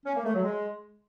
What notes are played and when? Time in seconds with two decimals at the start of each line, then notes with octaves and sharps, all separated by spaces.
0.06 C#4
0.15 A#3
0.25 A3
0.34 F#3
0.44 G#3